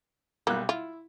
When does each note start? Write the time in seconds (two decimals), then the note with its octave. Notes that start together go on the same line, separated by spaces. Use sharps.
0.47 B1 G3 A#3 F#6
0.69 E4 F4